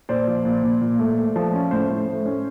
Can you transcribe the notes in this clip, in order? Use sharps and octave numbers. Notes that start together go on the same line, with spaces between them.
A#2 C5 D5
F3
A#2
A#2
A#2
A3
A3
F3
C#4
A2 C5
A2
A3
C#4